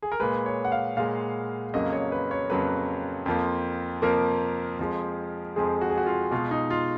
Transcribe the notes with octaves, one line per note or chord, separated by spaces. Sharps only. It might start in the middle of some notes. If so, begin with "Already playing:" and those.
G#4
A#4
A#2 G#3 B4
C#5
F#5
F5
A#2 G#3 F5
F2 C#3 F#3 A#3 D#5
C#5
B4
C#5
F2 C#3 F#3 A#3 B4
F2 F3 A#3
F2 F3 A#3 A#4
F2 F3 G#3
F2 F3 G#3 G#4
F#4
G#4
F#4
F4
B2 G#3 F4
D#4
F4